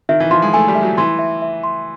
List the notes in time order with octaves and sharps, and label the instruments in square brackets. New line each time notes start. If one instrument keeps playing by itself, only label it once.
[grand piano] D#3 [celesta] E5
[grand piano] E3
[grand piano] F3 [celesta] C6
[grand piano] G#3
[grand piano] A3 [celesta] G#5
[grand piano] G3
[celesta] E5
[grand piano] F#3
[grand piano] E3 [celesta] C6
[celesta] E5
E5
C6